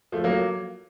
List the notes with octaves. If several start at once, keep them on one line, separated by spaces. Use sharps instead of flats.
F3 A3
F#3 A#3